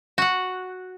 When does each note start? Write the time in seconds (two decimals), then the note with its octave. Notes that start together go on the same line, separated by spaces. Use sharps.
0.18 F#4 F#5